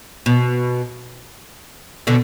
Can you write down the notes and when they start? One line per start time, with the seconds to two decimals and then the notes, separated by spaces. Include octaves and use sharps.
0.26 B2
2.07 B2 D3